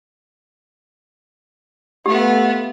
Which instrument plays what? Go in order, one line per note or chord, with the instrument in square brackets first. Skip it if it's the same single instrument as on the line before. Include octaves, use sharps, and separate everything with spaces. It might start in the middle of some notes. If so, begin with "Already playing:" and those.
[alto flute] A3 [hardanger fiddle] B3 F4 [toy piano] G4